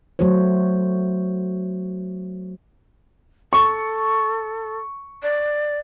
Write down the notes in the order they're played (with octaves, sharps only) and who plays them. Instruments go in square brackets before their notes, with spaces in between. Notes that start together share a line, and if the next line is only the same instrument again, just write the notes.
[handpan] F#3 A3 F#4 C5 C#5
[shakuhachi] A4 [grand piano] C#6
[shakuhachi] D5